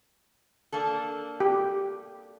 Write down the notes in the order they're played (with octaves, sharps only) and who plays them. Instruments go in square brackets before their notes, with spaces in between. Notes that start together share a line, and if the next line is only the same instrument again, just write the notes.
[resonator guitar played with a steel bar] A#3 D4 A4
[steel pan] G4